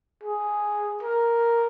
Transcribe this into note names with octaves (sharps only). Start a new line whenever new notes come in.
G#4
A#4